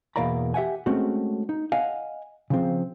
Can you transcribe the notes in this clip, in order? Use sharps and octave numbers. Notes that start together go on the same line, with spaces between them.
E2 B2 A#3 D5 A#5 B5
G4 E5 F#5 G#5
G#3 A3 C4 C#4 F#4
D#4
D#5 F5 F#5 G#5
C#3 F3 C4